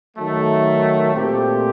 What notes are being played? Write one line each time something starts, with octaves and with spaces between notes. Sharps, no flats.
D#3 F#3 A3
A#2 A3 C4 G4